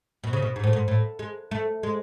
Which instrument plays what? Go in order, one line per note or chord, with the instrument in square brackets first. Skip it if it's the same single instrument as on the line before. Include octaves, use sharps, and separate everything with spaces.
[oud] B2
C#3
B2
G#2
A2
G#2
A2
G#3
A3
G#3